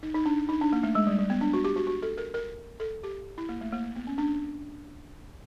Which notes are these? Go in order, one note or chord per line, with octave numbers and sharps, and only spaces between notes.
D#4
D#4
D4
D#4
D4
A#3
A3
G#3
G3
G3
B3
D4
F#4
G4
F#4
F#4
A4
A#4
A#4
A4
G4
E4
A#3
A3
A#3
B3
C#4
D4